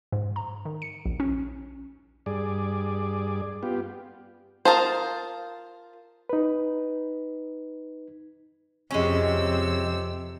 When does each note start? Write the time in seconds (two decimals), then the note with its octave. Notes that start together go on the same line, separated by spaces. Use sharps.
0.12 G#2
0.36 A#5
0.65 D#3
0.82 C#7
1.06 A#1
1.20 C#4
2.26 G2 G#4 D5
3.63 B3 F4 G4
4.65 F4 A#4 C5 A5 D#6
6.29 D#4 B4
8.91 F2 C3 G#3 C#4 E6